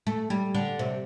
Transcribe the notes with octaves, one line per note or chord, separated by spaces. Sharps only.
A3
G3
D3
C3